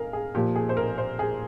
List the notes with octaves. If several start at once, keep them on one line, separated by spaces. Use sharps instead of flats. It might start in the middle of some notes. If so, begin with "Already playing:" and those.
Already playing: G#4 A#4 F5
G#4
A#2 F3 G4
G#4
C5
A#4
C5
G#4